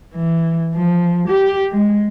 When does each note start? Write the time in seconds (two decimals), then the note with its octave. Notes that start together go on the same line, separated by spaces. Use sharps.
0.14 E3
0.74 F3
1.28 G4
1.72 G#3